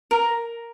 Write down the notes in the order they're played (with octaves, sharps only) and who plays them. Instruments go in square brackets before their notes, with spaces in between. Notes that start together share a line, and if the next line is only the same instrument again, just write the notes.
[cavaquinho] A#4